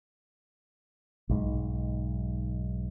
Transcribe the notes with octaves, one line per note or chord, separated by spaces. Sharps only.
B1 G#2